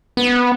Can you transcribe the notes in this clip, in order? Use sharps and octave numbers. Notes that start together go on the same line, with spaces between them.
B3